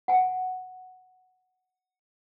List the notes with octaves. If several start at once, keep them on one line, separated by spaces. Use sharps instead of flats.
F#5 G#5